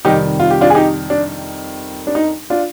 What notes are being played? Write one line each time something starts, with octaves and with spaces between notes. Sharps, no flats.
F2 C3 D#3 G3 D#4 G4
F4
G4
D4 F4
G#4
D#4 G4
D4
D4
D#4
D4 F4